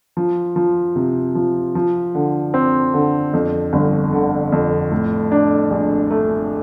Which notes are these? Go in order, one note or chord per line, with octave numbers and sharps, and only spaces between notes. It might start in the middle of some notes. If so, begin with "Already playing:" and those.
F3
F3
C3
F3
F3
D3
C4
D3
F2
G1
D3
F2
A2
D4
A#1
A3